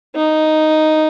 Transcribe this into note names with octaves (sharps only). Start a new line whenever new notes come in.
D#4